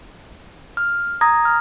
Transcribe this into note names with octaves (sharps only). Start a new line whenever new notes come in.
F6
A#5 D#6 G#6 A#6
F6